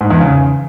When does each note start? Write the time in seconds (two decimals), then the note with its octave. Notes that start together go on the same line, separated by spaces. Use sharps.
0.01 G#2
0.10 E2
0.20 C#3